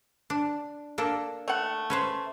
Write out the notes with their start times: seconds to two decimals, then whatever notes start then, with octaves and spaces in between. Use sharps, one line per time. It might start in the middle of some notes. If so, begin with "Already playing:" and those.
0.30 D4
0.98 A#3 D4 A4
1.48 A3 F#5
1.90 C#4 B4 C5